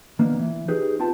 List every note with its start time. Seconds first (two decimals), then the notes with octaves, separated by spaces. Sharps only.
0.19 D#3 A#3 B3 D4
0.39 E3
0.68 D#4 G4 G#4 B4
0.99 C4 F4 G4 B4 G5 A5